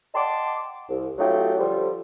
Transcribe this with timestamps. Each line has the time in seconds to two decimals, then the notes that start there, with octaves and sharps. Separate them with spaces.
0.14 D#5 F#5 G5 A5 C6 D6
0.89 C2
1.18 F#3 A3 C#4 D#4 F4 G4
1.59 D3 F3 G3